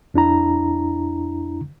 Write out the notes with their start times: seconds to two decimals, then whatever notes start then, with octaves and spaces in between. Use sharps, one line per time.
0.14 F2 D4 E4 A#5